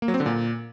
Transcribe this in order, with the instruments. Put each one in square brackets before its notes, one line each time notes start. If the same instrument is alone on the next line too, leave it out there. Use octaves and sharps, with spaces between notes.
[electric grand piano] A#3
F#3
C4
D3
A#2